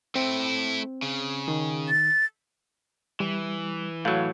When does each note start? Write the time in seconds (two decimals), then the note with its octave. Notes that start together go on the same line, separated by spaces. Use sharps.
0.15 A3 C4 E4
1.03 C#3
1.48 D#3
1.89 A6
3.20 E3 G3
4.05 A2 F#3 F5